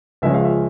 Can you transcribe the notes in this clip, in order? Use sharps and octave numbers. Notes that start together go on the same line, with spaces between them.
C#2 C#3 F3 G#3 C#4 E5
F5
E5